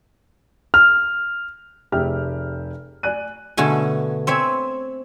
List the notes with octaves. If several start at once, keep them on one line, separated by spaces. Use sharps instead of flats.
F6
F1 G4 G#4 E5 G5 F6
D5 G#5 F#6 D#7
B2 D3 A3 G#5
C4 C#5 E5 G#5